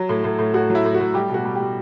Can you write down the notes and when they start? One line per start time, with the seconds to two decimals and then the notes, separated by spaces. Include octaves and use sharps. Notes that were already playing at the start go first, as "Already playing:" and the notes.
Already playing: F#3
0.09 A2
0.24 A2
0.39 A2
0.54 A2 F#4
0.70 F#3
0.75 E4
0.85 A2
0.94 F#4
1.00 A2
1.14 G3 G4
1.29 B2 F#4
1.45 G3
1.55 G3 G4